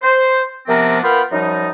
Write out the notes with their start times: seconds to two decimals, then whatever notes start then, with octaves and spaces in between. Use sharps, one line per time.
0.02 C5
0.67 C3 F3 B3 C4 D4 A#4
1.02 B3 F4 A#4 F5 G5 B5
1.31 F#2 F3 G3 D#4